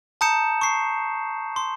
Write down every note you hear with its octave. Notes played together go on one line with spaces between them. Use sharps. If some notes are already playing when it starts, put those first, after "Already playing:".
A5 A#5 D#6 G6 C#7 E7
C#6 C7
C6